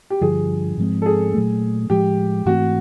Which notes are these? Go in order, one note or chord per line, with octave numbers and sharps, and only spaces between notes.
G4
G2 D3 F3 G#4
G#2 F3 G#3 C4
A4
G#4
A#2 F#3 A3
A2 F3 G#3 G4
G#2 E3 A3 C4 F#4